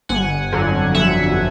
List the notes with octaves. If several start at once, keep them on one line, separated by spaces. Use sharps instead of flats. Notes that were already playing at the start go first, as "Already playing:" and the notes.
G1 F#5 G#5
F2 D3 F#3
G1 E5 F#5